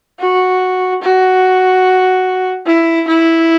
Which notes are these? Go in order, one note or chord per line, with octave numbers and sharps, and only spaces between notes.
F#4
F#4
E4
E4